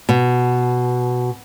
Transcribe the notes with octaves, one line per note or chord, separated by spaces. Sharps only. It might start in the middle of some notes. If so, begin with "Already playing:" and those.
B2